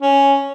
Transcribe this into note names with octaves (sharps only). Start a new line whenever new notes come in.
C#4